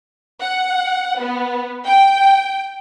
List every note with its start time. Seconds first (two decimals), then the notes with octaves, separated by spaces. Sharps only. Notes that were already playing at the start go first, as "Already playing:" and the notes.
0.42 F#5
1.19 B3
1.86 G5